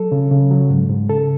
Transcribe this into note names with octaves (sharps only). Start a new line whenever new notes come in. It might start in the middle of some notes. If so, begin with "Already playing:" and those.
Already playing: F#3 A4
C#3
C#3
F#3
G#2
G#2
C#3 A4